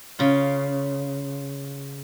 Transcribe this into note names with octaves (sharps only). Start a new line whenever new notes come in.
C#3 F4